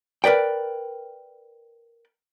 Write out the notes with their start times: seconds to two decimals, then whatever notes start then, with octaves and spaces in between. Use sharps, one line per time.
0.24 A#4 B4 D5 G5